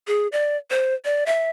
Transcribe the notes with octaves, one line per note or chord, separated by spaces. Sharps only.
G#4
D5
C5
D5
E5